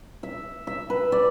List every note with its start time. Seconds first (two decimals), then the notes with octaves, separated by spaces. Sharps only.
0.23 E5
0.67 E5
0.90 B4
1.12 D5